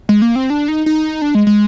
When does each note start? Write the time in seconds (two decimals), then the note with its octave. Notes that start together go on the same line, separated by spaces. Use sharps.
0.09 G#3
0.22 A#3
0.36 C4
0.50 D4
0.68 D#4
0.86 D#4
1.22 D4
1.35 G#3
1.47 G#3